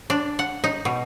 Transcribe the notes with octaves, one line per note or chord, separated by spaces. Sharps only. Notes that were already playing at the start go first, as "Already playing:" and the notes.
D4
F#5
D#4
B2